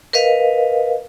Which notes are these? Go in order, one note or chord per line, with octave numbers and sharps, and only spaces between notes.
A#4 B4 D#5 F5